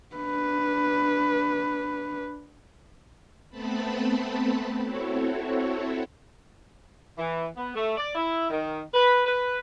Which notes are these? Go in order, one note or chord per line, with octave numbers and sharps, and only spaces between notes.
D4 B4
A3 B3 C4 A5 B5
C4 E4 F#4 A4 C#5
E3
B3
A3
D5
E4
D#3
B4
B4